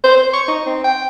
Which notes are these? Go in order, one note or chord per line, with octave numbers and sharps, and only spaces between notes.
C5
C5
C#6
D#4
C4
G5